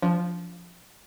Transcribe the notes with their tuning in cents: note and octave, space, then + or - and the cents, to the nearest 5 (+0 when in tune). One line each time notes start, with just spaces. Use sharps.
F3 +0 D4 -35